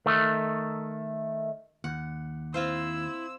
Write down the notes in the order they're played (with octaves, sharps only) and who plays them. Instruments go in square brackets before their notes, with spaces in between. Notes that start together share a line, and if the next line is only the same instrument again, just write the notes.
[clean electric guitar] D#3 A3
[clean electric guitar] D#2 [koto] F#5
[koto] C4 F4 C5 [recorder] E4 [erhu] E6